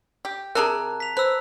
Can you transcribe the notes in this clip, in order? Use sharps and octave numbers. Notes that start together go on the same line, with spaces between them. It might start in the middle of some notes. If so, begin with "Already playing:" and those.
G4
C3 G4 G#4 A#4 A5 A#5 F#6
B6 F7
B4 C5 E6 F#6